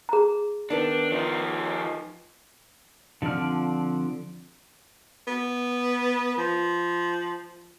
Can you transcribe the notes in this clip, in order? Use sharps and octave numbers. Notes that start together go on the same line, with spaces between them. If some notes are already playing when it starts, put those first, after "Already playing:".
G#4 A#5
D#3 B3 D4 E5
F3 D#4
D3 F3 C4 D5 F6
B3
F3